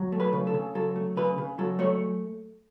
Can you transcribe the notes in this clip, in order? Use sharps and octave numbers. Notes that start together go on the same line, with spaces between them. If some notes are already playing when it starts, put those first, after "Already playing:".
Already playing: F#3
A3
B4
C#3
A4
C#3
F#3 A4
A3
C#3 B4
C#3
F#3 A4
A3 C#5